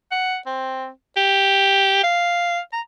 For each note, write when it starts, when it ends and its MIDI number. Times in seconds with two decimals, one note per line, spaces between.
0.11 0.37 78
0.46 0.89 60
1.16 2.00 67
2.03 2.60 77
2.72 2.80 82